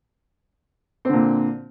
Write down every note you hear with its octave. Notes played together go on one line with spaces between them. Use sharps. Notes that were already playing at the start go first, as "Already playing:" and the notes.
A#2 D3 C4